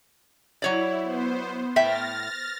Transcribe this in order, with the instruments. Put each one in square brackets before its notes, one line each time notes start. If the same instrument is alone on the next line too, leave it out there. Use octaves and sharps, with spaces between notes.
[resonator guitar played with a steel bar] F#3 C#5 D5 [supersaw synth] E4
[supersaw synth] B3 C5
[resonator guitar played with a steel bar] A2 E5 G5 [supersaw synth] F6 A6 A#6